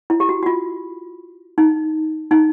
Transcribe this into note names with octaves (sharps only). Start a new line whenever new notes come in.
E4
G4
F#4
F#4
F4
D#4
D#4